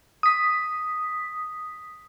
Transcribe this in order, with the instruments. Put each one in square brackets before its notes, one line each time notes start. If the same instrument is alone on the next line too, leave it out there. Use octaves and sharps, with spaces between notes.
[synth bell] D#6 B6